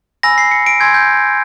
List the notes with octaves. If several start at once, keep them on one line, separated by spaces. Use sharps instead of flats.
G#5 B5 E6 A#6
C7
C#7
D7
G#5 C6 E6 G6 G#6
G6